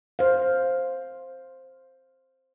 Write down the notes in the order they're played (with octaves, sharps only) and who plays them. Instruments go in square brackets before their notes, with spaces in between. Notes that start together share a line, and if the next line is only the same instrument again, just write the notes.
[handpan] C5 F5